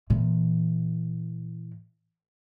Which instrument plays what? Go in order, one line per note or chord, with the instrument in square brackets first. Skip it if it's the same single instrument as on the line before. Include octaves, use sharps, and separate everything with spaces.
[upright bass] A#2 E3